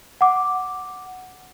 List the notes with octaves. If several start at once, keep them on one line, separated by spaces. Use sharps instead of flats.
F#5 D6